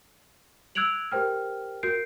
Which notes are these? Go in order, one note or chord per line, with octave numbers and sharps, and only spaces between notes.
E6 F#6 G#6 D7 F7 F#7
G4 A#4 C5 G5 F6
F#4 A#4 G6 C7 D7